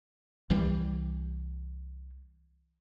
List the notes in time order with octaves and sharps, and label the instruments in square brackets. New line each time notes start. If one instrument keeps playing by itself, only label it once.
[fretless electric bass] C2 E3 G3